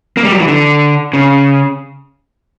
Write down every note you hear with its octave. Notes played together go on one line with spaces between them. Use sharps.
A#3
G3
F#3
E3
D3
C#3